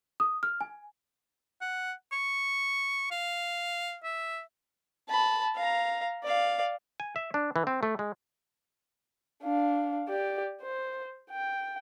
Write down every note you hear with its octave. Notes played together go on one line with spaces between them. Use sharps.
D#6
F6
G#5
F#5
C#6
F5
E5
A5 B5
F5 A#5
D5 F5
G#5
E5
D4
E3
C4
A3
G#3
D4 F5
G4 D5
C5
G5